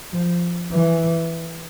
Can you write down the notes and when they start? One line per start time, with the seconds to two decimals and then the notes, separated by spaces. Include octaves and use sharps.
0.13 F3
0.73 E3